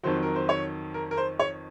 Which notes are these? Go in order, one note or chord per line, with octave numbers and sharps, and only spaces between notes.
F2 D#3 F#3 C5
A#4
C5
C#5
A#4
A#4
C5
C#5